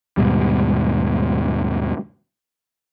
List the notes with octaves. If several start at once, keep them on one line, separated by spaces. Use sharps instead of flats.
D#2 G#2 B2 G3